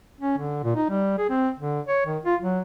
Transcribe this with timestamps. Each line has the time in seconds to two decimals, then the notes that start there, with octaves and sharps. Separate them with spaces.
0.21 C#4
0.38 D3
0.63 A#2
0.75 D#4
0.89 G3
1.18 G#4
1.30 C4
1.59 D3
1.86 C#5
2.06 D#3
2.25 F4
2.41 F#3